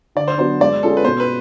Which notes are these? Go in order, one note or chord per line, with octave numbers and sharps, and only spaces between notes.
D3 D5
C5
F#3 B3 D4 C5
G#3 D5
C#4 F4 G#4 A4
B4
B2 C5
B4